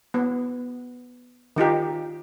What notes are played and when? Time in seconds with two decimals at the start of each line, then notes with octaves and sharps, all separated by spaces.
0.14 B3
1.56 D#3 D#4 F4 G4